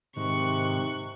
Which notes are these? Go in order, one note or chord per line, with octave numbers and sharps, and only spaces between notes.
G#2 C3 D#3 C#6 F#6